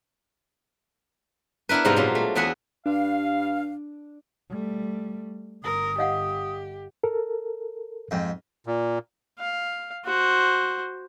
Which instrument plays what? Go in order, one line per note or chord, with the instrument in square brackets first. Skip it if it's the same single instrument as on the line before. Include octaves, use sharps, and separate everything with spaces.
[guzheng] B3 D4 E4 A#4 B4
G#2 C3 G3 B3 F4 A#5
A#2 F#3 G3 F4
A3
E2 B3 G#4 B4 E5 F#5
[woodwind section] G2 F5 [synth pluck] D4
[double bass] G3 A3
[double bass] G1 [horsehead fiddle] A#4 [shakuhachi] D#6
[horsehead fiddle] G4 [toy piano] D#5 F5 F#5
[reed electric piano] A4 A#4
[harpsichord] F2 G#2
[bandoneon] A#2
[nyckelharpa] F5
F#4 C5